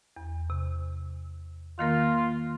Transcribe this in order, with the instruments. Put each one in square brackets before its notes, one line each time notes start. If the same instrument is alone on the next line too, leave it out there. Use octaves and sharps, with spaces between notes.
[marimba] E2
C3
[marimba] D#3 A#3 A#4 [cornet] F4